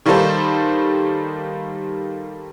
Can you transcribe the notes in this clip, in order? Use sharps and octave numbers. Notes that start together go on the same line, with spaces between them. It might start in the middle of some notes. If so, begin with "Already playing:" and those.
D#3 G3 A#3 D#4 A4 C5